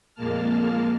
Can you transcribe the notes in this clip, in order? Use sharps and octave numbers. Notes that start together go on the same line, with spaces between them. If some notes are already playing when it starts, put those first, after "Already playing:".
F2 A#2 G#3 A#3 A5 F6